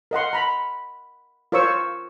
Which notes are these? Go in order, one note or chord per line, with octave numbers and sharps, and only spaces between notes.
A#4 D#5 F#5 C6
A#5 B5
F4 A#4 C5 C#5 C#6 E6